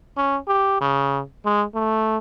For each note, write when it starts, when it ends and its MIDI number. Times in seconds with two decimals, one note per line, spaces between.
0.17 0.38 61
0.47 0.77 67
0.81 1.22 49
1.45 1.64 56
1.74 2.18 57